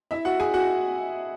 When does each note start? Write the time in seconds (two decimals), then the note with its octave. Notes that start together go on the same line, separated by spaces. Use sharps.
0.11 E4 E5
0.25 F#4 F#5
0.40 G#4 G#5
0.54 F#4 F#5